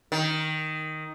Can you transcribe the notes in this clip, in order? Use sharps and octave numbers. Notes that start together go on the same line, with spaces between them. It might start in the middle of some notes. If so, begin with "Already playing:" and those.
D#3